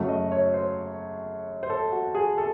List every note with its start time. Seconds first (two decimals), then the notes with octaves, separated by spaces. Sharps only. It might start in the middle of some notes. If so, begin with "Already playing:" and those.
Already playing: F#2 C#3 F#3 A3
0.08 D#5
0.32 C#5
0.54 C5
1.63 C5
1.70 A4
1.92 F#4
2.15 G#4
2.38 A4